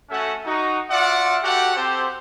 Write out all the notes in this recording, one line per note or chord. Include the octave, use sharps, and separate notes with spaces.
A3 C#4 F#4 A4 E5 F#5
D#4 F#4
F4 F#4 D5 E5 F#5
F#4 G4 A4 F#5
C4 G4 A4 C5